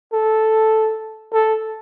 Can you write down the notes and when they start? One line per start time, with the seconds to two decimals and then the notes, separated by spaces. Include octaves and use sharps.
0.13 A4
1.33 A4